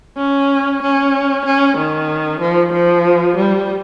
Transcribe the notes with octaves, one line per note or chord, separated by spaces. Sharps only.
C#4
C#4
C#4
D#3
F3
F3
G3